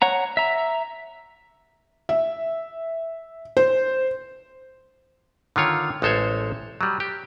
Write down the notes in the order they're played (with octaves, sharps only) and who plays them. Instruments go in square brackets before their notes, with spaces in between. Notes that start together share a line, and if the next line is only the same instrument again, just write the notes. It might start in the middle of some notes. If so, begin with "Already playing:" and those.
[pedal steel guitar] C#5 F#5 A#5
E5 A#5
[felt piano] E5
C5
[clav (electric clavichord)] D3 D#3 F4 C#5
A1 G#3 A4 C5 C#5
F#3 G3
G4